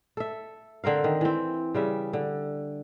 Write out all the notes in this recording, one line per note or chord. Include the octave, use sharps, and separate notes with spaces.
A4 E5
D3 C4 A#4 F5
D#3
E3 C4
C#3 G3 E5
D3